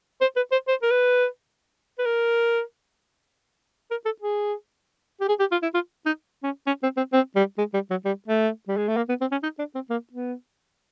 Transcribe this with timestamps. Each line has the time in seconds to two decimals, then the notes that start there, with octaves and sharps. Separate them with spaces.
0.21 C5
0.36 B4
0.51 C5
0.68 C5
0.82 A#4
0.91 B4
1.98 B4
2.05 A#4
3.91 A#4
4.05 A4
4.21 G#4
5.20 G4
5.28 G#4
5.39 G4
5.51 F4
5.62 E4
5.74 F4
6.06 D#4
6.43 C#4
6.67 C#4
6.83 C4
6.97 C4
7.13 C4
7.35 G3
7.58 G#3
7.74 G3
7.90 F#3
8.04 G3
8.27 A3
8.68 G3
8.77 G#3
8.88 A3
8.96 A#3
9.08 B3
9.21 C4
9.31 C#4
9.43 D#4
9.58 D4
9.74 C4
9.89 A#3
10.12 B3